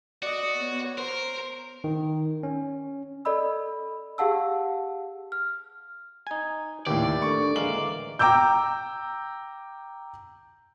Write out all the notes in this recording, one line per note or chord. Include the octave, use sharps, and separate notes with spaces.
F#4 D5 D#5
B3 C#5
A#4 C5
D#3
C#4
A4 D5 D#5 B5 E6
G4 G#4 F5 F#5 A5 E6
F6
D#4 G#5
D#2 A2 G4 D5
D4 A4 C#6
A2 D3 E3 G#3 A#3 F5 F#7
G5 A#5 D6 E6 G6